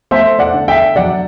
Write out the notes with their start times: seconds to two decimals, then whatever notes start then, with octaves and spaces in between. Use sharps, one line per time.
0.11 A3 C5 E5
0.39 D5 F#5
0.54 D3
0.68 E5 G5
0.96 F#3 D5 F#5